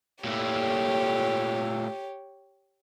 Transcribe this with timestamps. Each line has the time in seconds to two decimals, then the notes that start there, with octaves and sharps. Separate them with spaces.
0.24 A#2 A3 G4 C#5